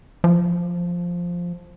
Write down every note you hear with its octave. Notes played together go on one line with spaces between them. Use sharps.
F3